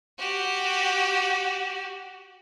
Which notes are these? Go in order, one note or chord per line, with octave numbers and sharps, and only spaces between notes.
F#4 G4